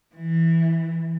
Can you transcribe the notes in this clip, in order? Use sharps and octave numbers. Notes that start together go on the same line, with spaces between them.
E3